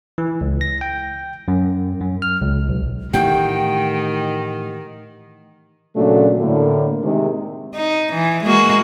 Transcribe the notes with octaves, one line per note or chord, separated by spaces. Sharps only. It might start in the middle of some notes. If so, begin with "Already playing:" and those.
E3
C#2
A#6
G5
F#2
F#2
F6
C#2
B1
A2 D#3 E3 A3 G4 F#5 G5
A#2 C#3 F#3 A3 D4 F#4
A2 D3 A#3
C3 D#3 G#3
D#4
E3
G#3 A#3 F#4